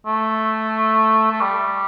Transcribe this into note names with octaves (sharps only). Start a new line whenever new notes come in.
A3
A3
G3